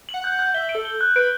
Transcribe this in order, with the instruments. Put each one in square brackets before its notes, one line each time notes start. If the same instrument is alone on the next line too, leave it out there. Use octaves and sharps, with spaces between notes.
[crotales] F#7
[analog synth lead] F#5
[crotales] G6
G6
[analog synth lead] E5 [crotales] G7
[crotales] D7
[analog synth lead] A4
[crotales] G7
F#6
[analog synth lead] B4 [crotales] D7